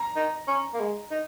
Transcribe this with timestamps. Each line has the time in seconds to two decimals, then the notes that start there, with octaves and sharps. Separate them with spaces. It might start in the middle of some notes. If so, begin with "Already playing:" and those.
Already playing: A#5
0.16 D#4
0.48 C#4
0.74 A#3
0.80 G#3
1.11 D#4